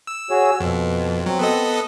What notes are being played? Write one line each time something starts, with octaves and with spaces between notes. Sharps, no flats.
E6
F#4 G#4 C#5
F2 B2
F#3 C4
B3 A4 D#5